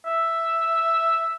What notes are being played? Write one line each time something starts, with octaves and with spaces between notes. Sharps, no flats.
E5